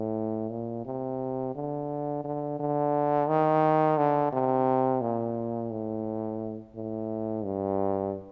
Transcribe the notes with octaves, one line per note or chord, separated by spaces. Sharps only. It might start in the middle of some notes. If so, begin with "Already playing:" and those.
Already playing: A2
A#2
C3
D3
D3
D3
D#3
D3
C3
A#2
A2
A2
G2